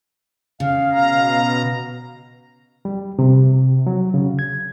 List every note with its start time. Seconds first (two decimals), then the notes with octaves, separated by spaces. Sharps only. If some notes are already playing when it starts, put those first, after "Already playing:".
0.60 C#3 F5
0.92 B2 A#5
2.85 G3
3.19 C3
3.87 F#3
4.14 C#3
4.39 G#6